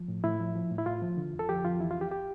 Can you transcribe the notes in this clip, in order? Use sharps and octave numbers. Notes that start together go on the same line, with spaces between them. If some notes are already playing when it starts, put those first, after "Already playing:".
Already playing: F3
A2
A2 E4
F3
F3
A2
E4
A2 F4
F3
D3
F2
A4
F3 G4
F2 F4
E3 E4
F2 F4
G4
G4